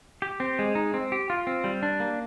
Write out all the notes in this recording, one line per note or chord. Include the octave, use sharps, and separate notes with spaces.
G4
C4
G#3
D#4
C4
G4
F4
C4
G3
D4
A#3